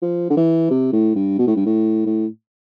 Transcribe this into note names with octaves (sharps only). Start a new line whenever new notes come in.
F3
D3
E3
C3
A2
G2
B2
A2
G2
A2
A2